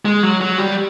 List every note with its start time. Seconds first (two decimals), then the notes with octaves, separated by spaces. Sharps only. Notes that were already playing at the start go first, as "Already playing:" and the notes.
0.05 G#3
0.23 F#3
0.41 F#3
0.58 G3